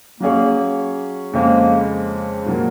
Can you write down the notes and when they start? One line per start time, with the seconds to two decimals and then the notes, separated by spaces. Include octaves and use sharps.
0.20 F#3 A#3 C#4 G#4 C#5
1.33 F2 C#3 G#3 A#3 C4
2.46 A#2 F#3 A#3